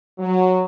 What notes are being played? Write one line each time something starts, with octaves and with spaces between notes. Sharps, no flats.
F#3